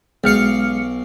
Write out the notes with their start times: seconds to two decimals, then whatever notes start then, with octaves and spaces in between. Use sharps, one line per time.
0.24 B1 G#3 F5 F6 C#7